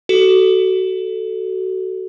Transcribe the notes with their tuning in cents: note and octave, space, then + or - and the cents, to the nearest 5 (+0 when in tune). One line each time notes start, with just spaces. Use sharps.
F#4 +25 A4 +0